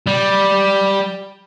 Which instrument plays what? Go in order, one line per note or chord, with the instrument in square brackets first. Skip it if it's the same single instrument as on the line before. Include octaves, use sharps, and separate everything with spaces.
[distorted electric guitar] G3